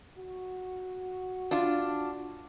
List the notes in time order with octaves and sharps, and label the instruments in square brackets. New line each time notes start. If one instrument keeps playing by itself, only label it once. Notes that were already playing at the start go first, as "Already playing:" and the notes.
[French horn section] F#4
[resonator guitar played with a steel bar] D4 F4